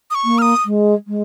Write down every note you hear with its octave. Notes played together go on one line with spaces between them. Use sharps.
D#6
C#6
A#3
F6
D#6
G#3
G#3